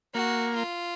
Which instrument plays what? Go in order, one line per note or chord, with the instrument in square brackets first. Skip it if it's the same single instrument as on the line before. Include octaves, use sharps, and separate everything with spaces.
[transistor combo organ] A#3 [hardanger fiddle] F#4
[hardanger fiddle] F4